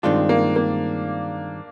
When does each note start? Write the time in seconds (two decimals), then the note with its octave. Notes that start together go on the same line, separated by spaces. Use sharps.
0.03 G2 D#3 G#3 C4 D4 F4
0.29 A#3
0.56 A#3